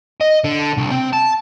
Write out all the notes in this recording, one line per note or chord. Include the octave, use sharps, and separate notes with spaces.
D#5
D3
C2
C4
A5